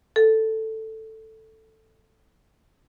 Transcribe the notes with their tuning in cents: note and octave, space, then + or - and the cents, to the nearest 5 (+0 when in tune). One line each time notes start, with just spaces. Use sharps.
A4 +5